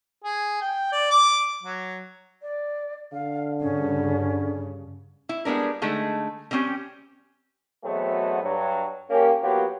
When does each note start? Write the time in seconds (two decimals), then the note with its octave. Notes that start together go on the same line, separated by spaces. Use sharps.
0.24 G#4
0.61 G5
0.92 D5
1.11 D6
1.63 F#3
2.42 D5
3.13 D3 F5
3.61 G2 C#3 C#4
5.29 E4
5.45 G3 G#3 B3 D4 A#4
5.82 D3 G#3 A3 D#4
6.51 D3 G3 C4 C#4 G4
7.84 E2 B2 F#3 A3 B3 C4
8.42 G2 F#3
9.10 A#3 C#4 G4
9.42 F#3 A#3 B3 F4 G4